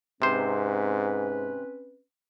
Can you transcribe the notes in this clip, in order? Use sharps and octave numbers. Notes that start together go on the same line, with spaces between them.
G#2 C3 C4 C#4 B4 C5